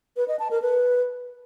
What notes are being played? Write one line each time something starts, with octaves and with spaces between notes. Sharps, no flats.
B4
D#5
A5
A#4
B4